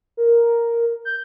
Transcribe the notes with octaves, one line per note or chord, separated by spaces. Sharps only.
A#4
G6